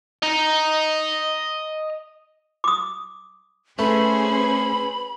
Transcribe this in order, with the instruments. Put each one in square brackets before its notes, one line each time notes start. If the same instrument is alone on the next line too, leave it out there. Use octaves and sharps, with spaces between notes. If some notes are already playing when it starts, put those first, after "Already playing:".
[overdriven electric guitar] D#5 A#5
[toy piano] D6 D#6
[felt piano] A3 [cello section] C#4 G#4 C5 [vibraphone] B4 [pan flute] B5